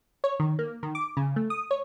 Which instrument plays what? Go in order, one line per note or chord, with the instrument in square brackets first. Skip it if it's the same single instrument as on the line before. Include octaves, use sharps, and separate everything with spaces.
[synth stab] C#5
D#3
A#3
D#3
D6
C#3
A3
D#6
C#5